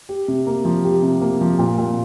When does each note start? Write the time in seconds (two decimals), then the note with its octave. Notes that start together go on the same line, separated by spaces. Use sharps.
0.09 G4
0.28 C3
0.47 A#3
0.65 F3
0.85 G4
1.02 C3
1.21 A#3
1.41 F3
1.59 A#2
1.78 A#2